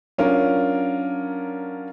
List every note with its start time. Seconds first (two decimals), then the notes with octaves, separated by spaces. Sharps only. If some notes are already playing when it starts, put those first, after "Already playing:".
0.18 F#3 C#4 D4 F4 A#4